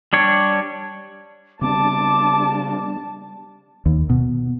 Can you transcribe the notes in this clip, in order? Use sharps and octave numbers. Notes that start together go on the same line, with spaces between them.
G3 D4 C#5
C#3 G3 B3 C4 D4 A5 D6
D#2
B2